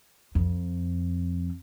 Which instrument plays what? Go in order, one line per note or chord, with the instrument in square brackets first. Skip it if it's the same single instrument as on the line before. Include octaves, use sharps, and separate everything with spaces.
[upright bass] F2